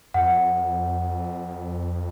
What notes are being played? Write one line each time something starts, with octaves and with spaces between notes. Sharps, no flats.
F2 F#5